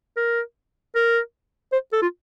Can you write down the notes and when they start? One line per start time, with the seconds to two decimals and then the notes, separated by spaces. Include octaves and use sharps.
0.17 A#4
0.95 A#4
1.72 C5
1.93 A4
2.02 F4